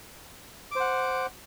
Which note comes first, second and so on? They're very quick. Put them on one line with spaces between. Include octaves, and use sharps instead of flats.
D6 C5 F#5